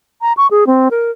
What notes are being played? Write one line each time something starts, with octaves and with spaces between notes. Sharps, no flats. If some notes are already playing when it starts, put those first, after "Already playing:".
A#5
C#6
G#4
C4
A#4